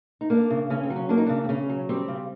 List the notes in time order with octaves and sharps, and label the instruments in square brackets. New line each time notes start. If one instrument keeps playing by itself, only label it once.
[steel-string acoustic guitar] D#4
A#3 D4
C#3
C#3 C#4
C4
F#3
C#4
A#3 D4
D#4
C#3 D4
C4
C#3 C#4
F#3
G3 C4
C#3